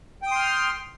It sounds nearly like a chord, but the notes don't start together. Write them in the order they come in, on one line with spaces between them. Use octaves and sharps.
G5 D#6 C6 F6